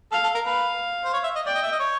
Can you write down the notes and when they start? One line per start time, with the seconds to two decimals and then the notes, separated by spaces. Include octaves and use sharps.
0.12 A4 F5
0.24 A4
0.34 A#4
0.46 B4 F5
1.05 C5
1.13 C#5
1.24 E5
1.36 D#5
1.46 D5 G5
1.55 D#5
1.63 E5
1.72 D#5
1.79 C#5